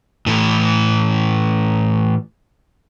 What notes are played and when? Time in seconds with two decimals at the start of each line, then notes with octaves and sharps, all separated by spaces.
0.26 A2 E3